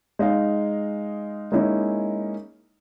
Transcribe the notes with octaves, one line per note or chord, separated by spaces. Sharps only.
G#3 D#4 D#5 F5
G#3 A#3 C#4 D#4 E4